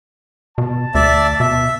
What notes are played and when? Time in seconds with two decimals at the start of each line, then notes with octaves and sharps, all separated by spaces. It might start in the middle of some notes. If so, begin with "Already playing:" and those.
0.58 B2 A5
0.95 D2 D5 E5
1.40 B2 E5